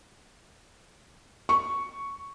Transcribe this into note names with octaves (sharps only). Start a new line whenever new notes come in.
C#6